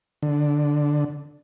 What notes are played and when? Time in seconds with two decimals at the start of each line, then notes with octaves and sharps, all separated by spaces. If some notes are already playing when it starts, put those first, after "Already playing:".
0.23 D3